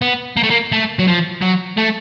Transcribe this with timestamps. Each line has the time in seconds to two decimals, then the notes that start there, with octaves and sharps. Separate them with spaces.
0.02 B3
0.37 A#3
0.43 A3
0.50 A#3
0.72 A3
0.99 F#3
1.07 F3
1.41 F#3
1.77 A3